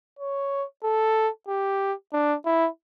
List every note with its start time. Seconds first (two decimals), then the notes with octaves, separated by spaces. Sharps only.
0.19 C#5
0.84 A4
1.48 G4
2.13 D4
2.45 E4